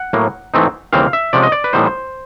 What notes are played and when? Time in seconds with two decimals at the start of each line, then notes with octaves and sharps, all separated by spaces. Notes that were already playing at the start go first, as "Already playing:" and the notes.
Already playing: F#5
0.13 A2 F#3 A#3
0.54 G#2 E3 A3 C4 D#4
0.93 D#2 C#3 E3 G3 C4 F5
1.13 E5
1.33 C3 F3 G#3 C#4 D5
1.43 D#5
1.52 D5
1.64 B4
1.73 A2 E3 G3 B3 D#4 C5